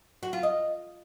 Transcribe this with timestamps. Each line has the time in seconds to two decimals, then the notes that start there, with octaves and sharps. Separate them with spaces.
0.23 F#4
0.33 F4
0.43 D#5